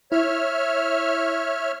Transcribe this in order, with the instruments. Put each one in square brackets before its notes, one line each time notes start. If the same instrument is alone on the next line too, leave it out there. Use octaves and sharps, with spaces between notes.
[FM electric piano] E4 [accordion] C#5 E5 F6